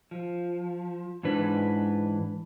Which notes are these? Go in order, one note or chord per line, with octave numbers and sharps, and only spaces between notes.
F3
G#2 E3 D4 B4